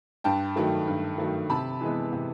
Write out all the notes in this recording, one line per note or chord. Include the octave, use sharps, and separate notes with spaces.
G2 G5 A5
D#3 F#3 A3
G2
D#3 F#3 A3
C3 A5 B5
E3 G#3 B3
C3